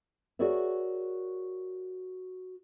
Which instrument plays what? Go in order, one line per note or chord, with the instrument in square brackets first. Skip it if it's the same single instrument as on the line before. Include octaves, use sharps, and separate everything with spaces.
[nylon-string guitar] F#4 G#4 A#4 C#5 D5 E5